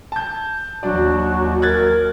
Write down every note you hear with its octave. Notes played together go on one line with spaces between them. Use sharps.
A5 G6
D#2 F#3 D4 F#4 D5
A#4 F#6 G#6 A6